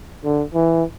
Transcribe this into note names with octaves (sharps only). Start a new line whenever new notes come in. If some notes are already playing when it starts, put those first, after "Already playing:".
D3
E3